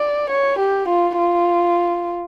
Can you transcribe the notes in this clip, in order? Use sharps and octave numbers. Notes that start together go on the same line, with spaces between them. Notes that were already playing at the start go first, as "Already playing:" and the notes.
Already playing: D5
C#5
G4
F4
F4